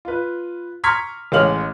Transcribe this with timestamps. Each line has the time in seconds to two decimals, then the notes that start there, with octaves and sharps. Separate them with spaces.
0.05 F4 B4
0.84 A#5 C6 C#6 F6 G#6 B6
1.32 A1 G#3 C#5 F5 F6 F#7